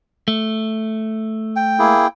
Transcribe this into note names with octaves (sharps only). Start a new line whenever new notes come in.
A3
G5
A#3 E4 G#4